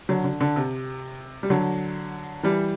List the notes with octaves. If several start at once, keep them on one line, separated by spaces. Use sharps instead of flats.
D3 F#3
D3
D3
C3
G3
D3 F#3
E3 G3